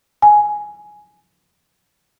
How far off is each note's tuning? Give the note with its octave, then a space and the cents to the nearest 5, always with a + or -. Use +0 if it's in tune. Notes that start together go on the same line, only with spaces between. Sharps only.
G#5 +10